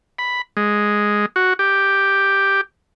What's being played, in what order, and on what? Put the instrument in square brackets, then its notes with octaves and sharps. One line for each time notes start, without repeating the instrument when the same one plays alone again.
[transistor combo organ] B5
G#3
F#4
G4